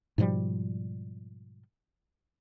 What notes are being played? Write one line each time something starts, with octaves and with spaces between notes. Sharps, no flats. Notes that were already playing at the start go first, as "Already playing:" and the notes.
G#2 B2 F3 G3